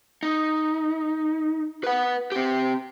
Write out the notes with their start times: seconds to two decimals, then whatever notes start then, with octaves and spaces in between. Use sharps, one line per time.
0.23 D#4
1.84 B4 F#5
2.32 C4 G4